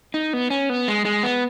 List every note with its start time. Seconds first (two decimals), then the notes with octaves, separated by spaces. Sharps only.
0.14 D#4
0.33 B3
0.50 C#4
0.69 B3
0.88 G#3
1.05 G#3
1.23 B3